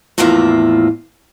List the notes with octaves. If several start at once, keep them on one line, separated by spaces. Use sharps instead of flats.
E2 A2 F3 A#3 F4 E5